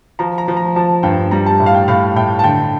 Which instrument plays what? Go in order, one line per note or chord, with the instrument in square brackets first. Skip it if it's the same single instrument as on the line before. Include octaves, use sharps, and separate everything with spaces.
[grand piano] F3 A#5
A#5
F3
A#5
F3 A5
G2 G5
G3 A#5
A5
A2
F5
G5
A2 F5
A2 G5
A5
D3 G5